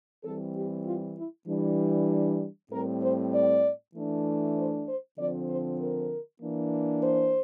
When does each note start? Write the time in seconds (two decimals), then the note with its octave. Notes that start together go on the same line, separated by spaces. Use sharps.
0.23 E3 G3 C4 A4
0.55 G4
0.86 F4
1.16 E4
1.48 E3 G3 D4
2.71 A2 G3 C4 A#4
3.02 C5
3.32 D5
3.94 E3 A3 D4
4.57 C5
4.88 C5
5.18 D3 F3 C4 D5
5.49 C5
5.80 A#4
6.42 E3 A#3 D4
7.03 C5